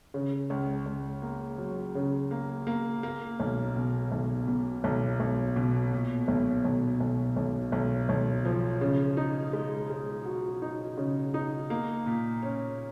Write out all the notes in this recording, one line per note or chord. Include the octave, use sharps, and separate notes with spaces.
C#3
C#2
C#2
A#3
F#3
C#3
A#3
A#3
A#3
B1
B2
B1
B2
B1
B1
B2
A#2
B1
B1
B1
B1
B1
B1
F3
C#3
D#4
G#3
G#3
F#4
D#4
C#3
D#4
A#3
A#2
C#4